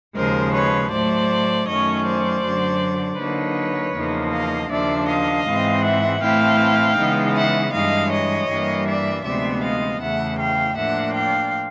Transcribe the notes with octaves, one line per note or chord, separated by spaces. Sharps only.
D#2 C#3 F3 G#3 A#4 C5
B4 C#5
A2 F#3 A3 C5 D5
F#2 D#3 F#3 A3 C#4 C#5 D#5
C5 D5
F#2 D3 F#3
D3 F#3 A#3 D#4 B4 C#5
E2 C#3 F3 A#3 D#4
D#5 F5
D#2 C#3 F3 A#3 D4 D5 E5
D#5 F5
G#2 E3 G#3 C4
E5 F#5
A2 E3 A3 C4 E4 F5 G5
C#3 E3 G#3 B3 D#4
E5 F#5
G2 E3 G#3 D#5 F5
C#5 D#5
G2 E3 G3 A#3
D5 E5
D2 C3 F3 G#3 B3 D5 E5
D#5 F5
E2 C#3 E3 A3 E5 F#5
F5 G5
A2 F3 A#3 D4 E5 F#5
F5 G5